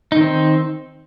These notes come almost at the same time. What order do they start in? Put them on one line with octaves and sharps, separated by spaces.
D#4 D#3 C4